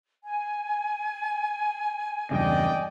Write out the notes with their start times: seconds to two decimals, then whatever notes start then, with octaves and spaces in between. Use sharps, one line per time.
0.25 G#5
2.31 E2 G2 C#3 D5 D#5 G5